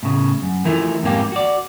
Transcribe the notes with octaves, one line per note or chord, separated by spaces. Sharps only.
A2 C#3
F#2
E3 F3 A3 E4 A#4
F2 G#2 A#3 G4
F#4 D5